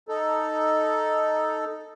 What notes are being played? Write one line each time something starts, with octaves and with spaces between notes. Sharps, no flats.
D#4 A4